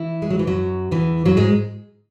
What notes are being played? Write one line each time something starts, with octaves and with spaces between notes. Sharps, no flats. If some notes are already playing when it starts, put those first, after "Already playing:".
Already playing: E3 E4
G#3
F#3
E3
F#2 F#3
E2 E3
F#2 F#3
G#2 G#3